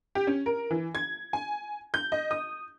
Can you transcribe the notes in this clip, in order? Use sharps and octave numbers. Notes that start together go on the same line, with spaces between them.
G4
C#4
A#4
E3
G#6
G#5
G6
D#5
D#6